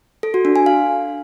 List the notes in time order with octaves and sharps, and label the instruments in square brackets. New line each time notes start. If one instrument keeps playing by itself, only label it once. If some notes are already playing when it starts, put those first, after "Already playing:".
[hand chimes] A4
F#4
D4
G#5
F5